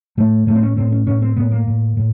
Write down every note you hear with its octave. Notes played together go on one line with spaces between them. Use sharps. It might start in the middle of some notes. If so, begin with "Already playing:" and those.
A2 A3
A2 A3
C4
C#4
A2 C4
C#4
A2 C#4
C4
A2 B3
A#3
A2
A2